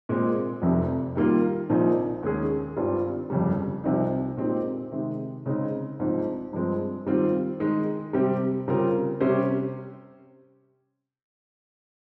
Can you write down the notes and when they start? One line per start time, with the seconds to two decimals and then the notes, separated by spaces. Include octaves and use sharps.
0.09 A#2 G#3 C4
0.62 F1 F2 C3
1.15 D#3 G3 A#3 F4
1.70 A#1 A#2 F3 C4 D#4
2.23 D#2 D#3 G#3 C#4 G#4
2.76 G#1 G2 G3 C4 F4
3.30 G1 F2 C#3 G3
3.84 C2 C3 F3 C4 D#4
4.37 A#2 G#3 C4 D#4 G4
4.91 C3 D#3 G#3
5.46 C#3 G#3 C4 D#4
5.99 A#1 G#2 F3 C4 D#4
6.53 G2 F3 G#3 C4
7.06 D#3 G3 C4 F4
7.60 D#3 G#3 D#4
8.13 C3 G3 C4 G4
8.68 C#3 G3 C4 F4 A#4
9.20 C3 G3 C#4 G4 C5